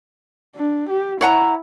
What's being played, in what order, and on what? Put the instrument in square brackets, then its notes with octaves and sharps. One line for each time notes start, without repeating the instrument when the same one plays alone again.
[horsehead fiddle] D4
G4
[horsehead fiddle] E4 [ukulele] C#5 F#5 A#5